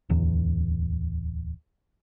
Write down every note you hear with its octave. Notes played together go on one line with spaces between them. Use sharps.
D1 E2